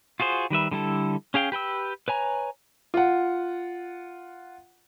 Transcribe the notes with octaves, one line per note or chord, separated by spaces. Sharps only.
F4 F#4 G#4 C5
D#3 G3 B4 E5
D3 G3 E4 A4
C#4 G#4 F5 G5
G4 B4 G5 E6
B4 C#5 G#5 A#5
F4 F#5